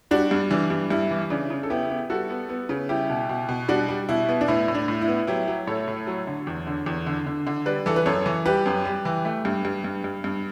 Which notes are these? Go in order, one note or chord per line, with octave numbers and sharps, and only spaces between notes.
G3 D4 F#4
G2
E3 D4
G2
G2 E4
E3
C#3 D4
C#3
A4
B3 E4 G4
B3
G3 F#4 A4
B3
B3
C#3
G3 E4 G4
B2
B2
B2
G3 D4 F#4
G3
B2 E4
B3
D4
A2 E4
A2
D4
A2
E4
B3
F#3 E4 G4
F#3
A2 A4 C#5
A2
F#3
D3
E2
D3
E2
D3
D3
D3
G3 B4 D5
E3 A4
B4
F#2 A4 C#5
E3
G3 G4 B4
F#2
G3
E3
A3
G2
G2
G2
G2
G2